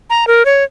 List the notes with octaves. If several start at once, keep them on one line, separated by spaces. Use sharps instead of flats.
A#5
A#4
C#5